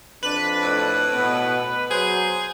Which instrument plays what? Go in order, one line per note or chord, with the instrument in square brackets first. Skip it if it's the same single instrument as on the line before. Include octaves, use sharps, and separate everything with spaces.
[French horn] F2 [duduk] D4 [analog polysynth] B4
[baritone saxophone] A2
[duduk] B2 [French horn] B3
[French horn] F#3 [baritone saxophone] G#4 [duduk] C5